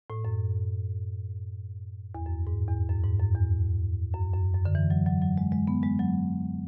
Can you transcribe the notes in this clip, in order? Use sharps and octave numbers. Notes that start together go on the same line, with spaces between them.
A2
F#2
E2
F#2
G#2
E2
F#2
G#2
F#2
E2
F#2
F#2
F#2
D3
E3
F#3
F#3
F#3
G#3
G#3
B3
G#3
F#3